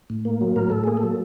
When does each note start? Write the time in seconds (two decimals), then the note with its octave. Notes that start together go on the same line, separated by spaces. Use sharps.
0.10 A2
0.25 A#3
0.41 F#3
0.56 A2 A#4
0.70 A2 A4
0.83 A#3 G#4
0.97 A4
1.03 F#3